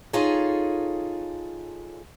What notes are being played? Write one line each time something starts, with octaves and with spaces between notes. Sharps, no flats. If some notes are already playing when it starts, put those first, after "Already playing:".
D#4 F4 G#4 A4 C#5